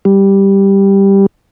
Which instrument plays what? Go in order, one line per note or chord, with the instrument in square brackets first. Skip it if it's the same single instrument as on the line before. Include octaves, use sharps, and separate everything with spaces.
[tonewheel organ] G3